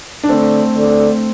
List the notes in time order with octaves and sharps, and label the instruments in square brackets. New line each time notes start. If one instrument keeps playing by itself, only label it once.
[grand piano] D4
[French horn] D3 [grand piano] A3 C4
[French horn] D3